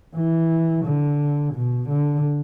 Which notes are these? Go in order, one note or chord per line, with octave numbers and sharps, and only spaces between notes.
E3
D3
B2
D3